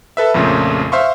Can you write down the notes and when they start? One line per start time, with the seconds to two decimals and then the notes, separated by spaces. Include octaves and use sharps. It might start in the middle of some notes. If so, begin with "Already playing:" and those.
0.17 A4 B4 E5
0.34 A#1 F2 A#2 C#3 A3
0.92 C5 E5 F5 C6 C#6